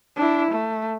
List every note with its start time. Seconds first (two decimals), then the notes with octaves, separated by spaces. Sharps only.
0.16 D4 E4
0.51 A3